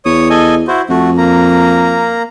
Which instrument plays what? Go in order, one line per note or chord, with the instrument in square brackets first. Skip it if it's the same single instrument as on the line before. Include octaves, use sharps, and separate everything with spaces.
[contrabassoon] E2 [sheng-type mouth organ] C#5 D#6
[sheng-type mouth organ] A4 D#5 G#5
E4 F#4 C5
[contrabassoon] F2 [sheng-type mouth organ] A3 F#4
[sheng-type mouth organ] A#3 A#5